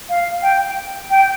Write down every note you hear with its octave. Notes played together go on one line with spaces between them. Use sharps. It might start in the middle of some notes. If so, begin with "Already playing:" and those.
F5
G5
G5